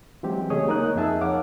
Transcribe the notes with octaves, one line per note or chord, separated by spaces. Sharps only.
E3 F#3 G#3 C4 G4
C#3 A3 G#4 C#5 D#5 D#6
A#3 D#4 A#4 C#5 D#6 F#6
F2 D#4 G#4 E5 A5 E6
A#4 C#5 F5 F#5 D6